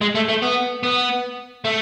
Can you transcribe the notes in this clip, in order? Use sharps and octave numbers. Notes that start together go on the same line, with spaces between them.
G#3
A3
A3
B3
B3
A3